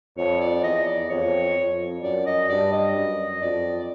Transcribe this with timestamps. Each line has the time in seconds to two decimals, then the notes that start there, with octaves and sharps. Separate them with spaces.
0.17 F2 C#5
0.41 D5
0.64 E2 D#5
0.87 D5
1.09 F2 C#5
1.57 F2
2.03 F#2 D5
2.26 D#5
2.49 G2 D5
2.73 D#5
2.96 F#2
3.42 F2 D5